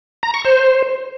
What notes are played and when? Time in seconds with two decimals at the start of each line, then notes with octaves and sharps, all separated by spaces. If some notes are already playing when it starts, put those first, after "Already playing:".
0.23 A#5
0.34 C#6
0.45 C5